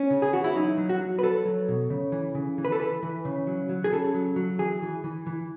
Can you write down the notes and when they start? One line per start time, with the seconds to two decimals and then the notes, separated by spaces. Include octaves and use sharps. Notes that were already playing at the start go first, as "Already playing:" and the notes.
Already playing: C#4
0.10 C#3
0.22 G#4
0.33 E3 F#4
0.44 E4
0.56 F#3 D#4
0.78 F#3
0.89 F#4
1.00 F#3
1.19 B4
1.23 F#3 A4
1.45 F#3
1.68 B2
1.90 C#3
2.12 E3
2.35 C#3
2.58 E3
2.65 B4
2.72 A4
2.79 E3 B4
3.03 E3
3.25 C#3
3.47 F#3
3.69 F#3
3.84 G#4
3.92 C#3 A4
4.14 F#3
4.36 F#3
4.59 E3 G#4
4.82 E3
5.04 E3
5.27 E3